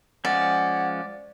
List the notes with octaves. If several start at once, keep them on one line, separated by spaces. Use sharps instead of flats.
F3 G#3 C#4 D5 F#5